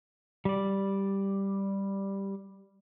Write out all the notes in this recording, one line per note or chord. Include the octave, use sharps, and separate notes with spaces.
G3 D5